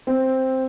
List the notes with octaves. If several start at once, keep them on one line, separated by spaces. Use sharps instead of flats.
C4